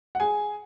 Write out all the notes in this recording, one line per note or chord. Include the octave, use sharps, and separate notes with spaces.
F#5
G#4 G#5